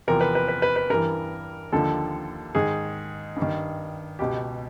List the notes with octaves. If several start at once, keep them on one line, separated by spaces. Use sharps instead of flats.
E2 C3 F3 A#4
B4
B4
B4
B4
B4
G2 E3 A#4
D#2 D3 F3 A4
G#2 D#3 G#4
G2
D#3
C#2 B2 G4